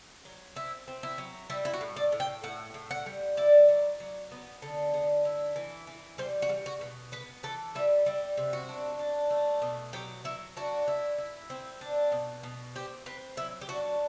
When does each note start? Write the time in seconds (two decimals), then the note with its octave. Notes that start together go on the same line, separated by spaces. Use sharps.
0.25 F#3
0.56 C4 E4
0.88 C4
1.03 E4
1.18 F#3
1.50 G3 E4
1.65 E4
1.74 F#4
1.81 A2
1.96 D5
2.12 A2
2.20 G5
2.44 A2 F#5
2.74 A2
2.91 F#5
3.06 G3
3.37 E4 D5
3.69 F#3
4.00 F#3
4.32 B3
4.62 D3
4.94 D3
5.25 E4
5.56 E3
5.87 E3
6.18 G3 C5
6.42 F#4
6.49 G3
6.66 F#4
6.81 B2
7.12 B3 B4
7.43 E3 A4
7.75 G3 E4
8.06 G3 E4
8.37 C3
8.53 F#4
8.69 D4
8.99 D4
9.31 A3
9.62 B2
9.93 F#3 G4
10.24 F#3 E4
10.57 D4 F#4
10.88 E4
11.18 E4
11.50 C4
11.81 D4
12.12 B2
12.43 B2
12.75 C4 G4
13.06 C4 B4
13.37 F#3 E4
13.61 G4
13.69 D4 F#4